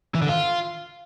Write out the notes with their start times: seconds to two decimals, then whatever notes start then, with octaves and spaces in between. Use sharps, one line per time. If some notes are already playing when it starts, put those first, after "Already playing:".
0.15 E3
0.22 D3
0.29 F4